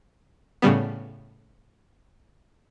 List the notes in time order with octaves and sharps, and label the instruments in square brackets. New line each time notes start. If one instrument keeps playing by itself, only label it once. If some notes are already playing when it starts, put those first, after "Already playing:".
[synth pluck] A2 C#3 G3 B3